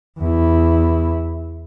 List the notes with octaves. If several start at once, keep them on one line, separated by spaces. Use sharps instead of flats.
E2 E4